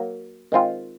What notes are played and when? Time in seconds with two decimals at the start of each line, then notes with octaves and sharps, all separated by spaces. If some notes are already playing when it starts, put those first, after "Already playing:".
Already playing: F#3 A#3
0.52 D#3 G#3 C4 F4